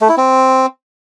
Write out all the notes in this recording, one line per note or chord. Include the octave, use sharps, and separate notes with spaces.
A3
E4
C4